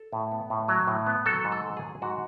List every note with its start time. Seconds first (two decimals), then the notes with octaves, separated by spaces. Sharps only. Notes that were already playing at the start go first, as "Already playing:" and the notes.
Already playing: A4
0.13 A2
0.32 B3
0.50 A2
0.68 F#3
0.87 A2
1.07 B3
1.26 F#3 A4
1.45 G#2
1.52 A4
1.65 F#3
1.77 G#4
1.83 F#3
2.02 G#2 F#4